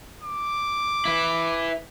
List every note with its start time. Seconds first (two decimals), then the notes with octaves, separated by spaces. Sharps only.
0.22 D6
1.05 E4 B4